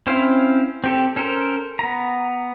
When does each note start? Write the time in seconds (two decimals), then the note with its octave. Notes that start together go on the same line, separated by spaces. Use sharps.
0.07 C4 C#4 E4 C5 F5
0.84 C4 G4 A4
1.16 C#4 A4 A#4 C5
1.79 B3 A#5